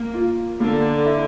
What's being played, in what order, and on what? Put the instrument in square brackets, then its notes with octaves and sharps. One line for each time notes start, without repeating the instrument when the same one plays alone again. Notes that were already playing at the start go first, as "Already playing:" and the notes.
Already playing: [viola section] A#3
[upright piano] F4
[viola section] D3 [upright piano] A#3
[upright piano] E4